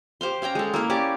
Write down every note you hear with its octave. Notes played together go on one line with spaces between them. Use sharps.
G4 C5 F5 C6
C#4 F5 G5 A#5
G#3 A4
A#3 E4 F5
C#4 G4 D5